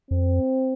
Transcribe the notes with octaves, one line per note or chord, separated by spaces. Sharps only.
F2 C4